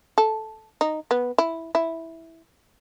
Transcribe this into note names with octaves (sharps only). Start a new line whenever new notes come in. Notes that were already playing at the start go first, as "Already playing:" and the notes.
A4
D#4
B3
E4
E4